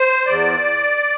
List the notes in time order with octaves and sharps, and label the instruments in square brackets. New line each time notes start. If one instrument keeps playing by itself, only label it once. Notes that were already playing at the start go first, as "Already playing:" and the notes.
Already playing: [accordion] C5
E2 D5